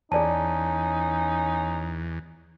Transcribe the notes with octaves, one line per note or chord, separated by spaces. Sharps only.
E2 C#4 D#4 G#4 D5 A5